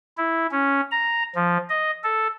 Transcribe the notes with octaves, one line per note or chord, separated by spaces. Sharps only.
E4
C#4
A#5
F3
D#5
A4